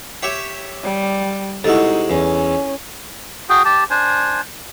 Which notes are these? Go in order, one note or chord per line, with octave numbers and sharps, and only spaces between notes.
G4 C#5 E5
G3
C3 G#3 D#4 E4 F#4 A4
E2 C#4
F#4 G#4 G5
G4 A5
D4 C5 G#5